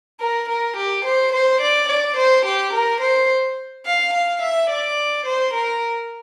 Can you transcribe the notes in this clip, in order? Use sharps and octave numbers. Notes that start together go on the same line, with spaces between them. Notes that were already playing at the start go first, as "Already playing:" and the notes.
A#4
A#4
G4
C5
C5
D5
D5
C5
G4
A#4
C5
F5
F5
E5
D5
C5
A#4